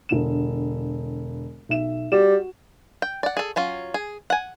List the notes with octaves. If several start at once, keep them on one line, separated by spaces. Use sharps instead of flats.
E1 D3 E7
B1 E5 E7
G3 F#4 E7
G5
D5 F#5
G#4 A4
F#3 C#4 F4
G#4
F#5 G#5